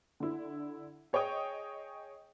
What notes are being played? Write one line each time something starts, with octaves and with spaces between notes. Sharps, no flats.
D3 E4
G#4 C#5 D#5 G5 D#6